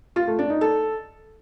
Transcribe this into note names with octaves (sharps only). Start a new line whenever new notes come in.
F4
A3
D4
D#4
A4